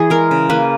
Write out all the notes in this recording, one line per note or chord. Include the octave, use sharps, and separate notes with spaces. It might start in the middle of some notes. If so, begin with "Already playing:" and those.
Already playing: E3 G#4
G#3 A#4
C#3
A#3 B4